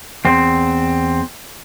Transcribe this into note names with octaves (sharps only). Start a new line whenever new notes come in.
E2 C4